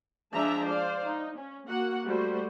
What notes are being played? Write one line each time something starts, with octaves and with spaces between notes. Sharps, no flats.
F3 G#3 D4 E5 A5 A#5
C5 D5 F5
D#4
C#4
A#3 F#4 F#5
G3 A3 F#4 C5